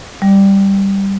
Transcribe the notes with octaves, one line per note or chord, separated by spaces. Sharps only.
G3